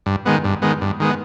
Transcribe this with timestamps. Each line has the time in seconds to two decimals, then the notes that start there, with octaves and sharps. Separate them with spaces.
0.06 G2
0.25 D#3 G#3 B3
0.44 G2
0.62 D#3 G#3 B3
0.81 G2
1.00 D#3 G#3 B3